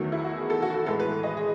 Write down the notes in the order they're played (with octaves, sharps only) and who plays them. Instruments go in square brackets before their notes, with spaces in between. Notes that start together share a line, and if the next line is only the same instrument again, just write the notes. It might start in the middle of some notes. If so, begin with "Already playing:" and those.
Already playing: [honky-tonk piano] E2 D#3 F#3 A3
E4
F#4
G#4
A4
F#4
F#4
A2 E3 G#3 A4
B4
D#5
G#4